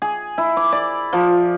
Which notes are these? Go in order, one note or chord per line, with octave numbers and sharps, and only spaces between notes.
G#4
E4
D6
D5
F3